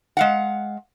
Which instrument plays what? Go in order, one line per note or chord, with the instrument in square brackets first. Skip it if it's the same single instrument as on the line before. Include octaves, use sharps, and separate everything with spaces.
[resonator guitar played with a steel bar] G#3 F5 F#5